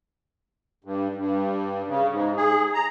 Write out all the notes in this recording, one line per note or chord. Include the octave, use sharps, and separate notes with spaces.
G2
G2
C#3
G#2
G#4
A#5